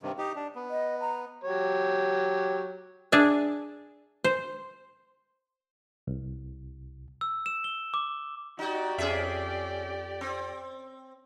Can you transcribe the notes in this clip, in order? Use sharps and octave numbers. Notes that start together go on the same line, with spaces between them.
G2 C3 D#3
D#4 G4
D4
B3
D#5
A#5
F#3 G4 C#5
D4 G#4 E5
C5
C2
E6
E7
G7
D6
D#4 F#4 G4 D5
F2 C#4 G#4 E5
C4